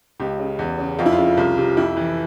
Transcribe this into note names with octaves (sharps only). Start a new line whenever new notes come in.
C#2 G4
C#3
E2
C#3
F2 F4
E4
F4
C#3
C2
C3
F2 E4
E3